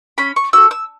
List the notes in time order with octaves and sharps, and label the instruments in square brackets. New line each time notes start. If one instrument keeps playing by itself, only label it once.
[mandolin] C#4 B5
C#6
F#4 A4 E6
E6